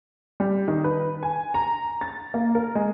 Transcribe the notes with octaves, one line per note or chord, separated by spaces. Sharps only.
G3
D#3
B4
G#5
A#5
A6
A#3
A#4
G#3